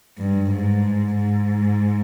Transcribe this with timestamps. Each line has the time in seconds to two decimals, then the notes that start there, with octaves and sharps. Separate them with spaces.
0.18 G2
0.51 G#2
1.15 G#2